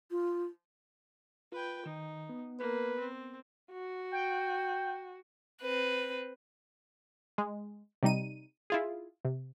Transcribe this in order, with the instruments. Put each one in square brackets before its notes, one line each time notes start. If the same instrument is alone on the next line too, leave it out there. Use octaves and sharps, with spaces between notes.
[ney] F4
[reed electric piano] F4 [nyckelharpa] B4 G5
[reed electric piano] D#3 [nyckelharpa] D#4
[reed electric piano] B3
[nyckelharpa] A#3 [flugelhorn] B4
[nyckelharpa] C4
[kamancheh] F#4
[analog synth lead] G5
[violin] C4 B4
[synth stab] G#3
C3 G3 D#4 D#7
E4 F4 G#4
C3